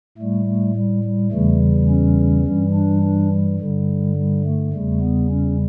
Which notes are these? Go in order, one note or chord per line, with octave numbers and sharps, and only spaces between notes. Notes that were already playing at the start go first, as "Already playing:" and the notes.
A2 G3 A3
A3
G3
G3
E2 C#3 E3 G3 A3
C#4
G2 E3 G3
D4
D4
G2 D3 G3
G3
A3
E2 C#3 G3 A3
B3
C#4